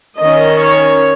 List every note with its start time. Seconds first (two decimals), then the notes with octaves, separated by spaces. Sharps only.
0.20 D#3 C#4 D#5
0.61 C#5